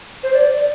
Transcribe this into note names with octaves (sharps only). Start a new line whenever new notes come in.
C5
D5
D5